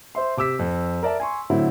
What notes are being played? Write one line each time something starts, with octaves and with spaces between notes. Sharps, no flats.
C5 E5 C6
C3 D6 E6 B6
F2
A#4 D5 E5 A5
G#5 C6 C#6
A2 D3 F#3 C4 E4